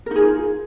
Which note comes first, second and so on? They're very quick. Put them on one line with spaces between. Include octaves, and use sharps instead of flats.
A#4 D#4 G#4 F4